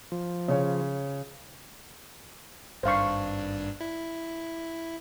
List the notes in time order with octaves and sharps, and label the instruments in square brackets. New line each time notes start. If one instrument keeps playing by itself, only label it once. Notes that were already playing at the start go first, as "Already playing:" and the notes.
[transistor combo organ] F3
[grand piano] C#3 C#5
[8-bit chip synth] G#1 G2 D4 [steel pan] C5 F5 C#6
[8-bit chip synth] E4